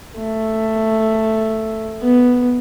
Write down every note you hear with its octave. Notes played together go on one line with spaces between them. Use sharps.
A3
B3